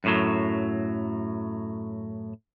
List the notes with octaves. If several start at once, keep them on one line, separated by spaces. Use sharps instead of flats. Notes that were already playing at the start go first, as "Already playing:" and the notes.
F#2 A2 F#3